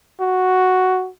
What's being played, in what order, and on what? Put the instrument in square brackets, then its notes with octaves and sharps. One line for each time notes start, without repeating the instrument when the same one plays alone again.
[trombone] F#4